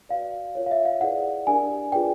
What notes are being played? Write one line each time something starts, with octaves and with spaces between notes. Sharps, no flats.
F#4 B4 D5 F5
F4 A#4 C#5
F5
E5
F5
E4 G#4 B4 D5 F#5
D4 G4 A#4 D5 G#5
F4 G#4 B4 D5 G5